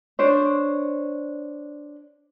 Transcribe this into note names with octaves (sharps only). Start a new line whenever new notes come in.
D4 C5 C#5